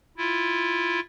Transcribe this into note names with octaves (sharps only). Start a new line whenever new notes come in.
E4 F4